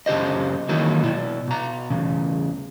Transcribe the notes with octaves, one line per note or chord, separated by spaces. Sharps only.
F#2 C#3 G4 C5 D#5
D#3 E3 F#3 A#3 D#4
B2 E4
B2 A#5
E2 C#3